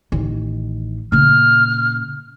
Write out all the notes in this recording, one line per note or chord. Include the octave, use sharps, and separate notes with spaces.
A1 D#3
A#2 C#3 F6